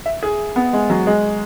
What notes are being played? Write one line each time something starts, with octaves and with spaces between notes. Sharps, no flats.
E5
G#4
B3
G#3
F#3
G#3